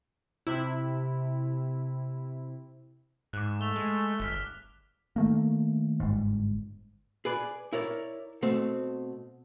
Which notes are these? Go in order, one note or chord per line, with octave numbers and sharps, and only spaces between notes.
C3 E4
G#2 D6 F#6
A3 F7 G7
G#3
G1 F6 B6 G7
D#3 A3 A#3
G1 G#2
G#4 B4 D5
E4 A#4 C#5 D5
B2 A3 C4